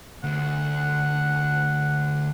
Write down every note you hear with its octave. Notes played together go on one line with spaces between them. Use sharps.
D2 F#5